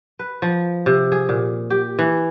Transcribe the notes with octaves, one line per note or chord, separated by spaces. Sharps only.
B4
F3
C3
G#4
A#2
G4
E3